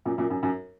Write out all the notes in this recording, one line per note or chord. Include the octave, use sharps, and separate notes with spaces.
F#2 A#2
F#2 A#2
F#2
F#2